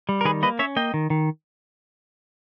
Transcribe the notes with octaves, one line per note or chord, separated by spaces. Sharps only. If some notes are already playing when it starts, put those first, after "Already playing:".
G3
A#4
D#3 G#4 B4
A#3 B4 D#5
C#4 C#5 E5
A#3 D#5 G5
D#3
D#3